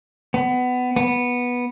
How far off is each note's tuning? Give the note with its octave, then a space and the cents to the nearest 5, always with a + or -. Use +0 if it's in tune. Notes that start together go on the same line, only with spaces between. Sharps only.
B3 +20
B3 -10